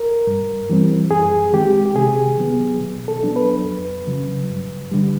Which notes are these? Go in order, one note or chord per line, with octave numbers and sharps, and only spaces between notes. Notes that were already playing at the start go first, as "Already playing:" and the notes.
Already playing: A#4
G2
E3 G3 C4
F#2 G#4
D#3 G#3 C4 G4
G4
C3 G#4
D#3 F#3 B3
B2
A4
F#3 B3 D4
B4
F2
C#3 F#3
G2
D3 G3